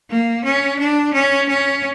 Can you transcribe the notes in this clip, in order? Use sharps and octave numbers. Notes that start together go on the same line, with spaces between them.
A#3
C#4
D4
C#4
C#4